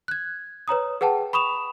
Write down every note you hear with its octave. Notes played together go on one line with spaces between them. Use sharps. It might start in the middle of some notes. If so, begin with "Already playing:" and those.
F#6 G#6
B4 C#5 A#5 D#6
G#4 B4 F#5 G5 A5
B5 C#6 D#6 E7 F7